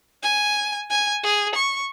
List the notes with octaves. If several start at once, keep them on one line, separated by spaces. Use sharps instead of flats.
G#5
G#5
G#4
C#6